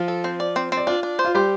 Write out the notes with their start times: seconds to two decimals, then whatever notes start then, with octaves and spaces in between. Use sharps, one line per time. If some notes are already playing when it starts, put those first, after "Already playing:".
Already playing: F3 F4
0.08 A4
0.24 C4
0.40 D5
0.56 C4
0.72 C4
0.77 D5
0.87 D4 F4 F5
1.03 D4
1.19 C5
1.25 F4
1.34 G3 G4 C5